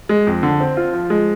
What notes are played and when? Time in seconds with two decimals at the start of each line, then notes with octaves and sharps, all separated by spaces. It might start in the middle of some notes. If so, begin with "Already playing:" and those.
0.09 G#3
0.27 F2
0.43 D3
0.60 C4
0.77 F4
0.93 F3
1.10 G#3